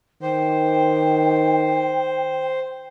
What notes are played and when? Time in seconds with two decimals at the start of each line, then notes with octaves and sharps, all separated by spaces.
0.22 D#3 C5 G5